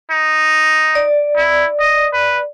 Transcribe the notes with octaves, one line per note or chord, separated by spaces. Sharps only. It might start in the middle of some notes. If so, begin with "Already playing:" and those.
D#4
D5
E4
D#5
B4